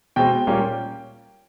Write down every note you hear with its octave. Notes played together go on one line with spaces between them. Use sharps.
B2 G#3 C4 G5
A#2 G3 A#3 C#4